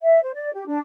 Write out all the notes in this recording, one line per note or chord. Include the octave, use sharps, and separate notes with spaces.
E5
C5
D5
G4
D4